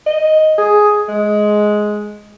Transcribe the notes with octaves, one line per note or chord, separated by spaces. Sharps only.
D#5
G#4
G#3